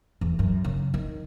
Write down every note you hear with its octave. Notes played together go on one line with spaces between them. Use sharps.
E2
F#2
C#3
D#3